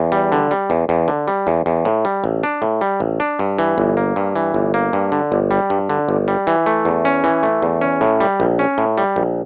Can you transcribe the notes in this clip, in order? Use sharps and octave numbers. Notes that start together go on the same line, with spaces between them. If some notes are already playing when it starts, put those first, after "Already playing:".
Already playing: E2
G3
D3
G3
E2
E2
D3
G3
E2
E2
A2
G3
A1
D4
A2
G3
A1
D4
G2
E3
G1
A#3
G2
E3
G1
A#3
G2
D3
G1
G3
G2
D3
G1
G3
E3
A3
E2
C#4
E3
A3
E2
C#4
A2
G3
A#1
C#4
A2
G3
A#1